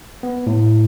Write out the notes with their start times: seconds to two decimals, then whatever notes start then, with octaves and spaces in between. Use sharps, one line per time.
0.23 B3
0.47 A2